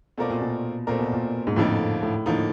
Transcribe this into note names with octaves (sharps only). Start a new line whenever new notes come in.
B2 A3 C4 F4 A#4 D5
A#2
B2
A#2 A3 C4 F4 A#4 D5
B2
A#2
G#2
F2 A2 D3 F3 A#3 D#4
A2
A2 D3 F3 A#3 D#4